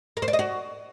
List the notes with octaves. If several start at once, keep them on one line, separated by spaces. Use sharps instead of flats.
A#4
C5
D5
D#5
F#4